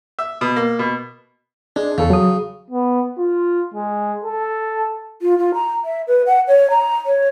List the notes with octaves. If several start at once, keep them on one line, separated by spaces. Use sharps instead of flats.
E5
B2
A#3
B2
G#3 D4
E2 C#3 A4
F#3 D#6
B3
F4
G#3
A4
F4
F4
A#5
E5
B4
F#5
C#5
A#5
C#5